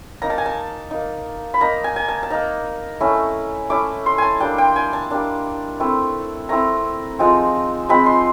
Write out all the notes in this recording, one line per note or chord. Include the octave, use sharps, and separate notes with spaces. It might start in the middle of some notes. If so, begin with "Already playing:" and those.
A#3 D#4 A#5
A5
G#5
A5
A#3 D#4
B5
A#3 D#4 A#5
G#5
G#5
A5
A5
A#3 D#4 A#5
A3 C#4 E4
A3 C#4 E4 D6
C6
G#5 A5
G3 A#3 D4 G5
G5
G#5
A5
G3 A#3 D4
A3 C4 E4
A3 C4 E4 A#5
F3 G#3 C4 D#4
F3 G#3 C4 D#4 B5
C6